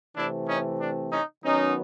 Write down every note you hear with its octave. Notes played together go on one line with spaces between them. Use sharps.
C3 E3 A3 C4 D4 E4
C#4 D#4
D4
C#4 D#4
D#3 F#3 B3 C#4 D#4